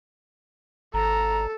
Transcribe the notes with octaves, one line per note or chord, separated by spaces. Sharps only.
G#1 A4 A#5